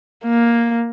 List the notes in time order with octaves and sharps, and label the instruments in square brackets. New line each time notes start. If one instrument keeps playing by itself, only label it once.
[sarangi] A#3